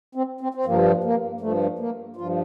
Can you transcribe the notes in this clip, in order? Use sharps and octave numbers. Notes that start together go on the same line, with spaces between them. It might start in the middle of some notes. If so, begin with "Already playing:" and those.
C4
C4
C4
G2 F3 A#3
A#3
G2 F3 A3
A#3
G2 F3 F4